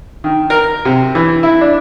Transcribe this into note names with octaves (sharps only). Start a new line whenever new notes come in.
D#3
A#4
C3
E3
E4
D4